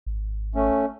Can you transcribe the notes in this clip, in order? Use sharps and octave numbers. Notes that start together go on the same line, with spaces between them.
G#1
A3 C#4